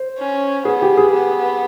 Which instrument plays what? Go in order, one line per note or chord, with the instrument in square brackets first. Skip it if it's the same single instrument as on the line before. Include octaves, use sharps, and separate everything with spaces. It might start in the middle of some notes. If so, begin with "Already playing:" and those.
Already playing: [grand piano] C5
[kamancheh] C#4
[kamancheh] B3 [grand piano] G#4
[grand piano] G4
G#4
[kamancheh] B3